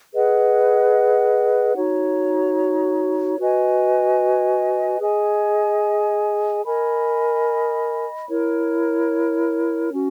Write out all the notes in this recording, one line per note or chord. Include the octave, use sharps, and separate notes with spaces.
G#4 B4 D#5 F#5
D#4 F#4 C#5
F#4 B4 D#5 G#5
G#4 D#5 G#5
A#4 D#5 G#5 B5
E4 A#4 C#5
C#4 F#4